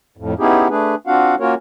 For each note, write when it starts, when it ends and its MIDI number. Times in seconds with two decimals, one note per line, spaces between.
0.17 0.34 41
0.17 0.34 45
0.39 0.68 59
0.39 0.68 61
0.39 0.68 63
0.39 0.68 64
0.39 0.68 67
0.39 0.68 68
0.70 0.95 57
0.70 0.95 62
0.70 0.95 68
0.70 0.95 71
1.07 1.35 60
1.07 1.35 62
1.07 1.35 65
1.07 1.35 66
1.07 1.35 77
1.07 1.35 78
1.40 1.54 58
1.40 1.54 61
1.40 1.54 65
1.40 1.54 66
1.40 1.54 70
1.40 1.54 73